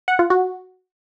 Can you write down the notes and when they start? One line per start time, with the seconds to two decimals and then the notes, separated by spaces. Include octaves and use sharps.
0.08 F#5
0.19 F4
0.30 F#4